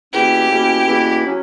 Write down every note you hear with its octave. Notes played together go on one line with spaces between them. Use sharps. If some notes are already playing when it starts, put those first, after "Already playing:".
E2 B2 A#3 C#4 E4 G4
E2 B2 A#3 C#4 E4
E2 B2 A#3 C#4 E4
F#3 C#4